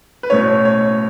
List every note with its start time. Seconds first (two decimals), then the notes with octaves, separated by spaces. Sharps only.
0.23 B4
0.30 B1 A2 A3 C#4 E4 C#5
0.65 C#5